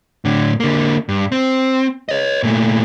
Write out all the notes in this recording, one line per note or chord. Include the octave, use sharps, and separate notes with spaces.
A2 D3
D3 A#3
G2
C4
C#5 D#5
A#2 A3